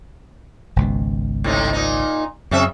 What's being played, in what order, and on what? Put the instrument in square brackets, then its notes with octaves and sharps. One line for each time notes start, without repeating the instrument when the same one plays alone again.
[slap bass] G#1 C#2 B2
[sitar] A2 C3 D#4
A#2 D#4
[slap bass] F#2 [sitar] C#3 C4 E5